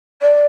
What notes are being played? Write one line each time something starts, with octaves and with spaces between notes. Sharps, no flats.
D5